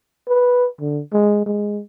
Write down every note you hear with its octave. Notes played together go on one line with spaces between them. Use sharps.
B4
D3
G#3
G#3